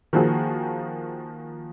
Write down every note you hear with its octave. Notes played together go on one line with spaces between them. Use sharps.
D#3 F3 A#3 F#4 G#4